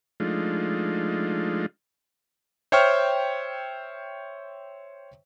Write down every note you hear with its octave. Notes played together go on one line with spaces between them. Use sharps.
F3 G#3 A3 D4 D#4 F4
C5 C#5 E5 G5 C#6 F6